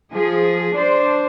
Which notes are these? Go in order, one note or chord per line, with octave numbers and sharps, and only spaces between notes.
F3 G#4
D4 C5